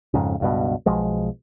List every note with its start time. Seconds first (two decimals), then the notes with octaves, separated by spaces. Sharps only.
0.14 F2 G#2 C#3
0.40 C#2 G2 B2
0.86 B1 B2 F3 G#3